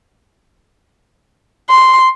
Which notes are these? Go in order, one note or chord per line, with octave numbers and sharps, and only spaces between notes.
C6